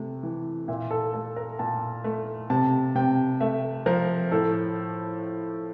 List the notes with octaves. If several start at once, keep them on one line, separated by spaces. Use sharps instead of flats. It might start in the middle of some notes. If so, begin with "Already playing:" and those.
Already playing: C3 A3
E3
A#2 E5
A4
A3 A4
A#4
A#2 A5
A3
C3 A5
C3 G5
A3 E5
F3 A#4
A2 A4